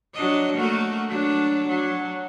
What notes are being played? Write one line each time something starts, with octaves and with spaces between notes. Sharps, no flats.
F#3 D4 D#5
A3 A#3 F#4
F#3 D4
F#3